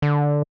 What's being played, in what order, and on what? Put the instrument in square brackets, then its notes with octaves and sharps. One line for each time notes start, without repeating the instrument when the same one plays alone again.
[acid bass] D3